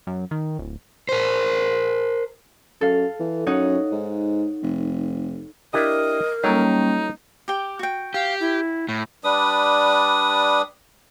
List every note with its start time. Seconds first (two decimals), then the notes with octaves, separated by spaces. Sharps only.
0.07 F#2
0.31 D#3
0.59 D1
1.09 A#4 C5
2.81 F#2 A4 F5
3.20 E3
3.46 F#2 D#4 C#5 F#5
3.92 G#2
4.63 F1
5.74 D4 E4 G4 A#4 D#5
6.44 F#3 G3 A#3 C#4 D#4 A4 C#5
7.48 G4 G5
7.79 F#4 G5
8.14 G4 F5
8.40 E4
8.89 A2
9.24 G3 D4 B4 D#6